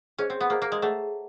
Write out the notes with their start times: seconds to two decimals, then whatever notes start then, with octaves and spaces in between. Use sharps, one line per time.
0.18 C#4 G#4 C5 D#5
0.30 C4
0.41 B3
0.50 A#3 G#4 C5 D#5
0.62 A#3
0.72 G#3
0.82 A3 G#4 C#5 F#5 A#5